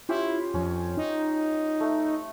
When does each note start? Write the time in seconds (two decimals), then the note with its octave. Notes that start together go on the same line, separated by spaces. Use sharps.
0.09 C#4 E4 F4 G4
0.54 F2 C#4
0.97 D#4
1.80 A3